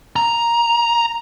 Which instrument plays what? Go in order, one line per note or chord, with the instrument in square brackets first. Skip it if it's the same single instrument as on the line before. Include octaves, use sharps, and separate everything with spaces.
[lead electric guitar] A#5